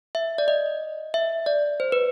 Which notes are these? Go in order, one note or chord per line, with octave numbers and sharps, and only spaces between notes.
E5
D5
D#5
E5
D5
C5
B4